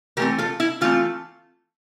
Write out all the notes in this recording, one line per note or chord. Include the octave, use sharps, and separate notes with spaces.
E3 A3 C4 G4 A#4
F4 A4
E4
E3 A3 C4 F4